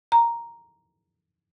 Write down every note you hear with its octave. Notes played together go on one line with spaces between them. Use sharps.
A#5